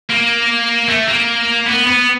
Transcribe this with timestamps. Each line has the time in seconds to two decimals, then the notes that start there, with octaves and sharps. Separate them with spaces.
0.10 A#3
0.88 A3
1.08 A#3
1.66 B3
1.86 B3